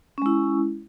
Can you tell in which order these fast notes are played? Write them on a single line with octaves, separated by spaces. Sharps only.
C#4 G#3 E4